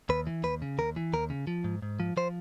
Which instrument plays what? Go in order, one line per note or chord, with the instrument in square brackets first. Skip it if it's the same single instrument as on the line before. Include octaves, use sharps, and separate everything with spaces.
[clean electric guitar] D#2 B4
E3
D#2 B4
C#3
D#2 A#4
E3
D#2 A#4
C#3
F3
G#2
G#2
F3
F3 C5